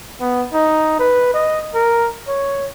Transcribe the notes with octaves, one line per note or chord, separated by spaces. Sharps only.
B3
D#4
B4
D#5
A#4
C#5